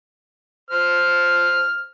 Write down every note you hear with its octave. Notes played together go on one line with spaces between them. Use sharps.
C5 F6